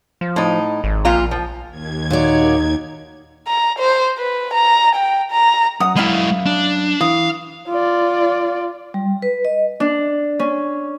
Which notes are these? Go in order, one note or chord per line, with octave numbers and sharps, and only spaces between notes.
F3
A2 D#4
G#1
A#1 A#2 F4 A#5
F3
D#2 G#6
A#2 D#4 F#4 C#5 D5
A#5
C5
B4
A#5
G5
A#5
F#2 F#5 D#6
G#3 E4 E5 F5 B5
D4
E3 F5 D#6
F4 D5
G3
B4
D#5
D4
C#4